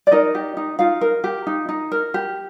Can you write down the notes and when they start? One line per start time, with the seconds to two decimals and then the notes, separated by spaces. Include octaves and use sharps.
0.07 D5
0.12 D#4 A#4 D#5
0.35 G4
0.57 D#4
0.79 D#4 F4 F5
1.01 A#4
1.24 G4
1.47 D#4
1.69 D#4
1.92 A#4
2.14 G4